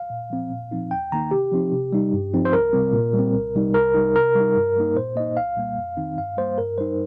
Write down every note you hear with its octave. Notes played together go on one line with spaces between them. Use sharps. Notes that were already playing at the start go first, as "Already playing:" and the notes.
Already playing: F5
A#2
F3 C4
A#2
F3 C4 D#4
D#2 G5
D#3 A#3 D#4 A#5
C3 G4
F3 C4 D#4
C3
G3 D#4
G2
F3 C4 D#4
C5
C2 A#4
C3 G3 C4
A#2
G3
C4
C2
C3 G3 D#4
C2 A#4
C3 G3 D#4
C3 A#4
G3
D#4
G2
G3 A#3 D#4
A#2 C5
A#3 D#4 D#5
C2 F5
A#2 G3 A#3
F2
D#3 C4 D#4
G2 F5
G3 A#3 C5
G2 A#4
G3 D#4 C5